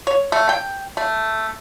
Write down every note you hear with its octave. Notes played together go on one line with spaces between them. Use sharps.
C#5
A3
G5
A3